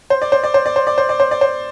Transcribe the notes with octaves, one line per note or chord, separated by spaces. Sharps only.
C5
D5
C5
D5
C5
D5
C5
D5
C5
D5
C5
D5
C5